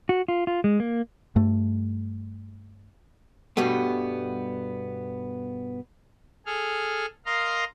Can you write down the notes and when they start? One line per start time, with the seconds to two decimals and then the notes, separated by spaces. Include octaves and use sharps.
0.09 F#4
0.28 F4
0.47 F4
0.64 G#3
0.80 A#3
1.36 G2 A3
3.57 G2 B2 G3 A3 B3
6.46 G#4 A4 F6
7.26 A#4 D#5 F5 A#5 C6